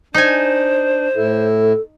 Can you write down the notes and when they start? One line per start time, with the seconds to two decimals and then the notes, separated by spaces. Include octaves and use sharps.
0.14 D4 D#4 C5 G#5
1.16 A2 E4 A4